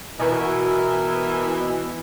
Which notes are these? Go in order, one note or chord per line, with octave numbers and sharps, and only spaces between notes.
B2 E3 A#4 E5 G#5